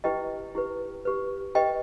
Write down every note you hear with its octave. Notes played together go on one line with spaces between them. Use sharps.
E4 G4 B4 D#5 G5
E4 G4 B4
G4 B4
G4 B4 D#5 G5